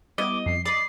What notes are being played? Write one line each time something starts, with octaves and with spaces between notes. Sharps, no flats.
G3 B3 E4 D#5 D6
F2 C7
D5 D#5 B5 D#6 C7